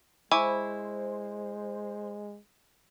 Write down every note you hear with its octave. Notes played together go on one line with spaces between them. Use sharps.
G#3 E4 C5 G#5 C#6 D6